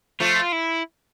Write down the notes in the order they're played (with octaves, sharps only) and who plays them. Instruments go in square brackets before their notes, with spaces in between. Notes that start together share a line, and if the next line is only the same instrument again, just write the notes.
[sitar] F3 A3 [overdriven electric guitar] F4
[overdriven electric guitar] E4